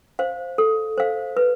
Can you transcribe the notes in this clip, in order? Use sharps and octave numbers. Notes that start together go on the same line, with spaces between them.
C5 F5
A4
C5 F5
B4